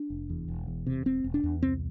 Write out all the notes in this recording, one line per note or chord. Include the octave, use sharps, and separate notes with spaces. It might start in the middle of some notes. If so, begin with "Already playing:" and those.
Already playing: D4
F1
E2
E1
E2
C3
E1 C4
E1
D4
E2
C2 C4